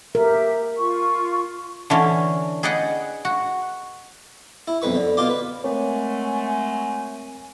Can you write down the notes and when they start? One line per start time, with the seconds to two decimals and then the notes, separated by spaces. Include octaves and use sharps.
0.15 G4 A#4 E5
0.78 F4 C#6
1.90 D3 E3 C#4
2.63 G#4 B4 D5 D#5 F#5 G5
3.25 F#4
4.68 E4
4.82 B1 F2 B4 C#6
4.95 D3
5.17 B2 F4 C6 D6
5.30 B4
5.64 F#3 G#3 A3 C4 A#4 C#5 G#5